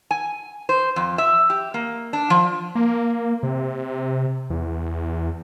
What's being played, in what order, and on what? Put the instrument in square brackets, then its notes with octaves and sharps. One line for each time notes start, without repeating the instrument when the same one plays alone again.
[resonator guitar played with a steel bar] G#5
C5
F2
E5
G4
A#3
D4
F3
[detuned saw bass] A#3
C3
E2